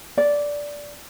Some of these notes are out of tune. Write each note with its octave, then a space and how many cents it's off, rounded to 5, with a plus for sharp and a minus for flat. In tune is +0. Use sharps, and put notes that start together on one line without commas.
D5 -10